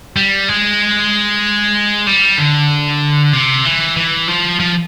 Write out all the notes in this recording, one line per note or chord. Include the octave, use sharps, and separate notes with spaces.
G3
G#3
G3
D3
C3
E3
E3
F3
F3